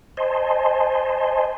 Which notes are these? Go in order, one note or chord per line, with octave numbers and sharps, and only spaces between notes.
C5 D#5 G#5 A5 C6